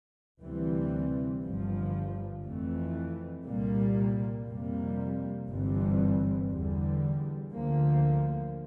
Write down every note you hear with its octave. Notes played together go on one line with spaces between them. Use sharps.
D2 C3 E3 G3 C4
G1 G2 F3
F2 E3 A3
C2 A#2 G3 A#3
F2 C3 G3 A#3
G1 G2 E3 G3 C4
E2 D3 G3
D2 D3 F3 A#3